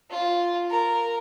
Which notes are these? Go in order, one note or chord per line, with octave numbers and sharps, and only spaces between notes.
F4
A#4